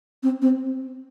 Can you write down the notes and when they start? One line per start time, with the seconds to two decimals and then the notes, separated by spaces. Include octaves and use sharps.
0.23 C4
0.42 C4